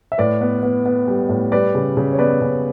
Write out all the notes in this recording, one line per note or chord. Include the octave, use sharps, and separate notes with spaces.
E5
A2 B4 D5
B3
B3
B3
G3
A2
G3 B4 D5
C#3
C#3
C#5
B3 B4 D5
C#3